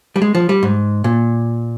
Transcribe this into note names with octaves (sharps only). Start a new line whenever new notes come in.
G3
G#3
F3
G3
G#2
A#2